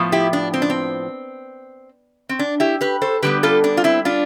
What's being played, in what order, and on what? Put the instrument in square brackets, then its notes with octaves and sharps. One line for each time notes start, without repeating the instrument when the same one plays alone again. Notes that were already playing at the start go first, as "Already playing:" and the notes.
Already playing: [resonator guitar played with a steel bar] A2 F3 B3
E4 G4
D4
C4
D4
C4
C4
D4
E4 G4
G4 B4
A4 C5
D3 G3 B3 G4 B4
F4 A4
D4
F4
C4 E4
D4 F4